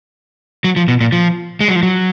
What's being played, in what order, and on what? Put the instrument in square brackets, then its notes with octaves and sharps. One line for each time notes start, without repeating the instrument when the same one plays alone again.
[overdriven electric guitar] F#3
F3
B2
A#2
F3
G#3
F#3
F3
F#3